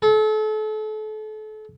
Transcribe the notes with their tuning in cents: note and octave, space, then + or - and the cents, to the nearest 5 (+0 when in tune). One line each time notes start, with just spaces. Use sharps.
A4 -35